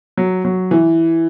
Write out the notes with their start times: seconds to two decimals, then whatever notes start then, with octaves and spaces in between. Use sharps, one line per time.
0.17 F#3
0.45 F#3
0.71 E3